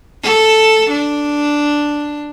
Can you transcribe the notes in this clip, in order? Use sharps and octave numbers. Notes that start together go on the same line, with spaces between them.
A4
D4